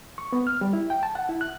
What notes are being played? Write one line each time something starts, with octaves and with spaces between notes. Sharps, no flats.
C#6
B3
F6
G3
E4
G5
A5
F#5
E4
F#6